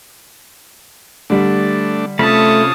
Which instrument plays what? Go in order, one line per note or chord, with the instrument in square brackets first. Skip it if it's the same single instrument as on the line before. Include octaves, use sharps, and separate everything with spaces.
[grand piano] D3 G3 [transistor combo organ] A3 D4
[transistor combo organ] C3 C#4 F4 [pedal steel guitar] A3 B5 [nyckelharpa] A5 D#6